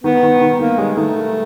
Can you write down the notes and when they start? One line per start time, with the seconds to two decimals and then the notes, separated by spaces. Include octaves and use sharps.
0.04 D#3 B3
0.23 D#3
0.41 D#3
0.60 D#3 A#3
0.79 G3 G#3
0.97 D#3 A3